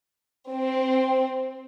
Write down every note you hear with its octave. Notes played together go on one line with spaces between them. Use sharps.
C4